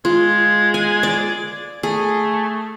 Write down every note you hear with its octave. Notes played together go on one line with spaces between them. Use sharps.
G#3 F4
G#5
D5
A3 G#4